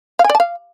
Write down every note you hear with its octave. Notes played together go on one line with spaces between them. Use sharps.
F5
G#5
D5
A5
F5